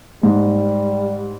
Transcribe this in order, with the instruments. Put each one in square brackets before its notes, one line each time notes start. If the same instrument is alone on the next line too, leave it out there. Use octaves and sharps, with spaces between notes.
[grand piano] G#2 [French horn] G3